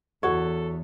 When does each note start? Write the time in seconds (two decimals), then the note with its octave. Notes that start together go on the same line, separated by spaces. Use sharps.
0.23 E2 F#4 A4 C#5